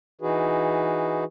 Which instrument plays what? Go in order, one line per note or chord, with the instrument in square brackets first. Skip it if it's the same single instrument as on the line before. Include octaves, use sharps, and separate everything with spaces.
[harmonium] E3 D#4 F#4 G#4 B4